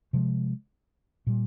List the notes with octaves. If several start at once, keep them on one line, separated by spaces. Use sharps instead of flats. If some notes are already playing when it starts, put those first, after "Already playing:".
C3 F3 G#3
A#2 G3